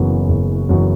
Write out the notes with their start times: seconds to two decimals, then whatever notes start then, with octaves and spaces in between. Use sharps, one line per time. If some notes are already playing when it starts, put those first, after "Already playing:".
Already playing: F#1 F#2 E3 B3 F#4
0.28 F#1
0.69 F#2 E3 B3 F#4